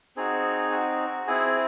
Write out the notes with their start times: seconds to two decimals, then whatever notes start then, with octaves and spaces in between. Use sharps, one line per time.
0.16 C4 D#4 F#4 G#4
0.72 F#4
1.27 C4 E4 G#4